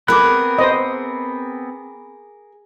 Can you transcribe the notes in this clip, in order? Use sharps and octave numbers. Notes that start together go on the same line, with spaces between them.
B3 C4 G#4 A#4 B5 D6 F#6
C5 D#5